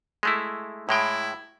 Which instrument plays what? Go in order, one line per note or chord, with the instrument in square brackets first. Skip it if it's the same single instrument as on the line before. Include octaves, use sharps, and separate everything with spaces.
[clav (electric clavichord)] G#3 A3 E4
[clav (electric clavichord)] A2 G#3 G5 [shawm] E4